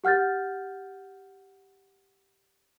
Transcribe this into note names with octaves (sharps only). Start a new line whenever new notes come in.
G4 F#5 F6 G6 A6